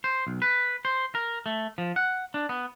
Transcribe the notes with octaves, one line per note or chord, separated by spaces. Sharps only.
C5
B1
B4
C5
A#4
A3
F3
F#5
D4
B3